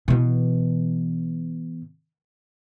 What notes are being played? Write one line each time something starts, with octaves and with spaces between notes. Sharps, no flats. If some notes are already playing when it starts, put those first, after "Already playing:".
B2 E3